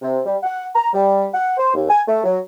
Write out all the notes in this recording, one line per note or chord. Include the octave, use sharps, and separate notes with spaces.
C3
G3
F#5
A#5
G3
F#5
C5
D#2
G#5
A3
F#3